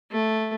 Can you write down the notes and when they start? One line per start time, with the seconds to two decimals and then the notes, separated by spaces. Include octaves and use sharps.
0.11 A3